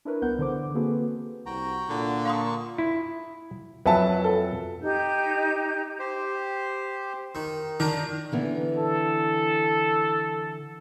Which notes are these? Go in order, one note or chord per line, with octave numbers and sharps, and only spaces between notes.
D4 E4 A#4 B4 C#5
C2 B3 A#4 F#5 G6
D3 E3 C5 D6
A#3 C4 F#4 G#4 A4 B4
C2 F#4 G5 A#5
A#2 D3
A#3 F5 A5 C6 C#6 D#6
E4
F2 F#3 B4 E5 A5
A4
D#4 G4 G6
G4 C5
D#3
D#3 D4 A#5
D3 E3 B3
A4